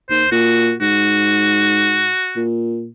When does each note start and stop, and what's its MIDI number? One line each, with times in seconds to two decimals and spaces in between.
0.10 0.24 39
0.10 0.30 72
0.31 0.73 46
0.31 0.73 66
0.81 2.13 44
0.81 2.47 66
2.36 2.87 46